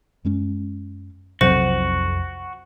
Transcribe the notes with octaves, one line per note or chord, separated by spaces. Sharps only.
F#2 G#3 C#4
B1 F2 C3 F#3 C4 F#4 C5